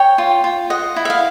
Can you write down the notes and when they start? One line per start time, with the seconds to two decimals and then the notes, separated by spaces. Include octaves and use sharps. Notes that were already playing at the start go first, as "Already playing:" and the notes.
Already playing: C#5 G5
0.18 F4
0.44 F4
0.70 D#5 F#5
0.96 E4
1.05 E5
1.10 F5